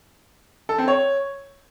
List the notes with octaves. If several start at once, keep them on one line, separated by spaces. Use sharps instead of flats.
A4
C4
C#5